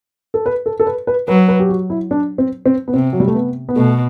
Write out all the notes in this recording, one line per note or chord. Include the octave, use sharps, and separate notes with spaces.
A4
B4
A4
A4
B4
B4
F#3 B4
B4
G4
F#4
E4
D4
C4
C4
B3
C3 C4
F#3
G3
A3
B3
B3
B2 A3